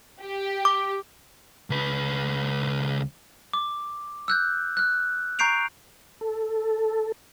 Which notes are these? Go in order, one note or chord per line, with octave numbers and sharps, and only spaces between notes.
G4
D6
C#2 B4
D6
E6 F#6 G6
F6 F#6
A#5 C#6 G6 C7 D7 F7
A4